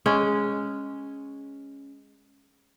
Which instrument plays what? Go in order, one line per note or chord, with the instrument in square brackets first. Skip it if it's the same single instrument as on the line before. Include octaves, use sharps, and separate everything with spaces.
[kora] G#3 C#4